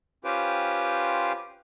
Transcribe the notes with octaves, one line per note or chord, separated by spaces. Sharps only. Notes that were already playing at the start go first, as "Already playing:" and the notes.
C#4 F4 G4 B4 C5 G5